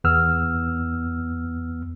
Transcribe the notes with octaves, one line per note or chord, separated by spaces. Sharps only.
E2 B3 E6 F6